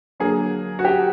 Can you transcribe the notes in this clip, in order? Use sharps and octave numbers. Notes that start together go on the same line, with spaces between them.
D3 F#3 A#3 G#4
F#4
G4